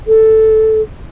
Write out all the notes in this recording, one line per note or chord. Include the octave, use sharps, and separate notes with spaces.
A4